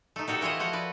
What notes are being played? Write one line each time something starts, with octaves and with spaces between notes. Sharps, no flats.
A3 D#4
D#4 F#4 G4 A4
E3 E4 F4 C#5 D#5
F3 F#4 C#5 D#5
B4 D5